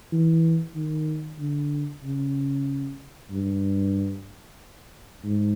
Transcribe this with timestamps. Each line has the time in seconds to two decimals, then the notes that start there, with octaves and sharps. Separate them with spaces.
0.12 E3
0.75 D#3
1.40 D3
2.04 C#3
3.31 G2
5.24 G#2